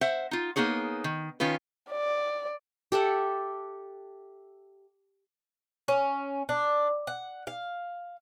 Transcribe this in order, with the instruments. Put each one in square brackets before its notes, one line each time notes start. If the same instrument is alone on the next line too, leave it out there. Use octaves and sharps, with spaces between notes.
[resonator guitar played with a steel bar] C5 E5 F#5
D#4 F4
A#3 B3 D#4 G#4 C#5
D#3
D#3 C#4 F4 B4
[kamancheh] D5
[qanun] G4 A4 E5 F#5
[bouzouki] C#4
D4
F#5
F5